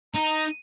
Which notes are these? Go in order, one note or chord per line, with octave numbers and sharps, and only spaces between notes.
D#4 A#5